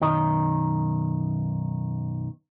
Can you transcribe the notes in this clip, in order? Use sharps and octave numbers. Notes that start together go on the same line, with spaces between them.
B1 F#2 D#3 D#5